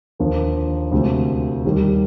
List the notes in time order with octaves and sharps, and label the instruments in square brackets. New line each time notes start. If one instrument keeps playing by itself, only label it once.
[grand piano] D#2 D3 F3 A#3
D2 C3 F3 G#3
D#2 D#3 G3